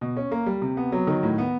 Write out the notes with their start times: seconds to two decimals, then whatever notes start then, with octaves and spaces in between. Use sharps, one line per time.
0.01 B2
0.17 C#4
0.31 A#3
0.46 G3
0.62 C3
0.77 B3
0.92 F#3
1.07 D#3
1.23 A2
1.38 B3